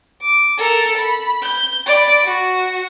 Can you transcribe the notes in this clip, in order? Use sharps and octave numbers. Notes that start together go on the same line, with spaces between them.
D6
A4 A#4
B5
G6
D5 B5
F#4